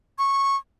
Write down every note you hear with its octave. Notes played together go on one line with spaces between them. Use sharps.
C#6